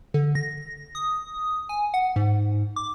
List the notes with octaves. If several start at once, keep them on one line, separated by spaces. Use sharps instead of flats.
D3
A#6
D#6
G#5
F#5
G#2
D6